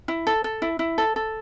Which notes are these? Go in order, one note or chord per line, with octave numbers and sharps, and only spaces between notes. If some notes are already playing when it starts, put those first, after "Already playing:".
E4
A4
A4
E4
E4
A4
A4